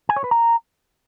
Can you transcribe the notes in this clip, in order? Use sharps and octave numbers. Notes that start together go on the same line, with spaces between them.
G#5
C#5
B4
A#5